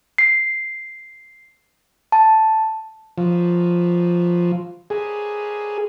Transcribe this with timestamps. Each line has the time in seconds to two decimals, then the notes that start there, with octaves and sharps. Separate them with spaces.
0.18 C7
2.12 A5
3.18 F3
4.90 G#4